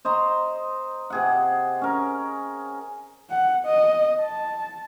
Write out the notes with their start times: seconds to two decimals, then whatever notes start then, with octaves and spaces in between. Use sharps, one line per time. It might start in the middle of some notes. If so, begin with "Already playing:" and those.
0.05 C5 D#5 A#5 C6
1.10 C3 G#4 F#5
1.81 C#4 A#4
3.30 F#5
3.65 D#5
4.21 A5